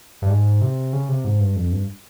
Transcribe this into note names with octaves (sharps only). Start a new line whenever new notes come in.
G2
G#2
C3
C#3
C3
G#2
G2
F2
G2